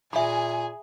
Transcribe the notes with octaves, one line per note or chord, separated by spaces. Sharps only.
A#2 G#4 E5 G#5 B5